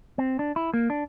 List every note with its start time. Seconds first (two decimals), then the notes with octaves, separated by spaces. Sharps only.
0.18 C4
0.39 D4
0.56 E4
0.74 A#3
0.90 D4